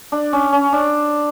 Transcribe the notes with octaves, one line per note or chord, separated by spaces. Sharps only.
D4
C#4
C#4
D4